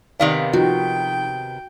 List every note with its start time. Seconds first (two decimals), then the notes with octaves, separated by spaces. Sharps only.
0.20 C3 D#3 B3 D5 F5
0.53 F3 D#4 F#4 G5